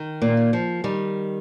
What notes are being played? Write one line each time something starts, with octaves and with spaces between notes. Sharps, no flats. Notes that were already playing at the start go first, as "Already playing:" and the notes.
Already playing: D#3
A#2 A#3
D#3
F3
D#3 G3